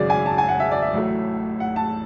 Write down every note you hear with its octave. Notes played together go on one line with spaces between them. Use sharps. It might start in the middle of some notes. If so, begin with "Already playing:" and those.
Already playing: G#1 F#2 C#3 F#3 G#4 D5
G#5
A5
G#5
F#5
E5
D5
E5
A1 A2 F#3 A3
F#5
A5